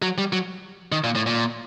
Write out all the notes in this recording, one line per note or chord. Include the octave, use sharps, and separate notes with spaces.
F#3
G3
F#3
D#3
A#2
A2
A#2